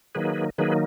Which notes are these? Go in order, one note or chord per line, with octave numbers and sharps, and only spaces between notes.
D#3 F#3 A#3 D#4 G#4 B4
D#3 F#3 A#3 D#4 G#4 B4